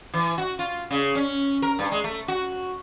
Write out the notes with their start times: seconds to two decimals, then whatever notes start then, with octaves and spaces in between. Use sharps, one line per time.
0.14 E3
0.38 F#4
0.59 F4
0.91 C#3
1.15 C#4
1.62 A#4
1.79 G2
1.91 G#3
2.04 A3
2.28 F#4